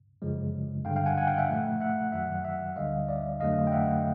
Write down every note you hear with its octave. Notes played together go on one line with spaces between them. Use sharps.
F#2 C#3 F3 G#3
G2 D3 G3 F5 G5
F5 G5
F#5 G#5
F#5 G#5
F5 G5
E5 F#5
A#2 F3 A3
E5 F#5
F#2 D#3 F#3 E5 F#5
E5 F#5
D2 D3 G3 D#5 F5
D5 E5
F2 D3 F#3 A3 D#5 F5
G5
E5 F#5